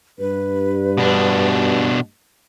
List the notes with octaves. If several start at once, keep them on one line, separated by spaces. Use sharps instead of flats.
G2 B4
B2 D4